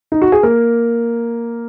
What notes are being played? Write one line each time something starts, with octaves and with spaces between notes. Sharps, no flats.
D#4
F#4
G#4
A#3 A#4